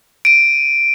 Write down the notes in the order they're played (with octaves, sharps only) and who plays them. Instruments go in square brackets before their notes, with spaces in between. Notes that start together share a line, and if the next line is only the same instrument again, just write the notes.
[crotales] D7 D#7